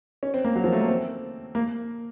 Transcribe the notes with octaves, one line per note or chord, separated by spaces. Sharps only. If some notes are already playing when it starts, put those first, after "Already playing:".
C#4
C4
A#3
F#3
F3
A3
A#3
C4
A#3